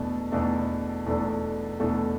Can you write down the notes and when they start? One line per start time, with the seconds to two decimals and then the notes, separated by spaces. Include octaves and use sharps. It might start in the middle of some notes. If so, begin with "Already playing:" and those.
Already playing: E2 B2 A3 D4 A4
0.32 E2 B2 A3 D4 A4
1.06 E2 B2 A3 D4 A4
1.80 E2 B2 A3 D4 A4